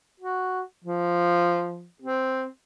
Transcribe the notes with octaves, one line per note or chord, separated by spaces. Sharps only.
F#4
F3
C4